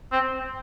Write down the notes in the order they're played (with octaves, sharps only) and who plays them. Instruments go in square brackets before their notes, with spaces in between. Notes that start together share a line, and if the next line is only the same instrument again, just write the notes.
[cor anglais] C4